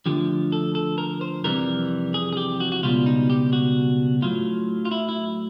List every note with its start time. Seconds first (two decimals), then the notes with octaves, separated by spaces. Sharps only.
0.06 D2 D3 F3 G4
0.52 A4
0.75 A4
0.98 A#4
1.21 C5
1.44 F2 C3 E3 G3 A#4
2.14 G#4
2.33 G#4
2.37 G4
2.60 F#4
2.72 F#4
2.83 C#2 B2 G3 F4
3.06 D#4
3.30 G4
3.53 F#4
4.22 A2 F#3 F4
4.85 F4
4.91 E4
5.09 E4